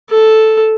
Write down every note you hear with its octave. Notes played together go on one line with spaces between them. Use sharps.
A4